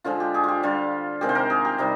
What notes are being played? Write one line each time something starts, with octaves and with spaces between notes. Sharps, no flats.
D3 F3 G#3 F4
G4
G#4
F4 G4
D3 G3 F4
C3 D#3 G#3 G4
C5
A#4
G#4
G4
C3 G3 D#4